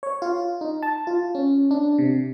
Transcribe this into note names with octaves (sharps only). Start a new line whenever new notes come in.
C#5
F4
D#4
A5
F4
C#4
D4
C3